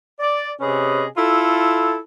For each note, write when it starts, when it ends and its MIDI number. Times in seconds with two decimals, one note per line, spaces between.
0.20 0.50 74
0.60 1.04 48
0.60 1.04 61
0.60 1.04 68
0.60 1.04 71
0.60 1.04 75
1.17 1.97 64
1.17 1.97 65
1.17 1.97 69